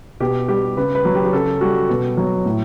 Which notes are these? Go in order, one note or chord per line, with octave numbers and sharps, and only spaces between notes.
B2 G4
G3 G4
C#3 B4
B4
F#3
G4
G4
C#3 A4
G3 F#4
B2
F#3
A2